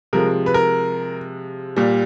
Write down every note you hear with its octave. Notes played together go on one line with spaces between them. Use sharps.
C3 F3 G#3 A#4
B4
A#4
A#2 G3